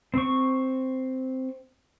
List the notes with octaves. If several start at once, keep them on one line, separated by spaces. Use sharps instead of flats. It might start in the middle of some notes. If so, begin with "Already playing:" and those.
C4 C#6